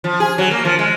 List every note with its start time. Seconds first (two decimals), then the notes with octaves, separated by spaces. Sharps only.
0.04 F3
0.20 G#4
0.38 F#3
0.51 A#3
0.65 F3
0.79 G#3